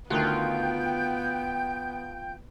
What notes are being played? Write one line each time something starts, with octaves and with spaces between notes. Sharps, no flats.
D2 D#3 B3 F4 G5 F#6 G6